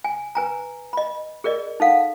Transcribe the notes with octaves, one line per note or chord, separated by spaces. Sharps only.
G#5
B4 G#5 A#5
D#5 B5
G#4 A#4 D5 D#5
D#4 A4 F5 F#5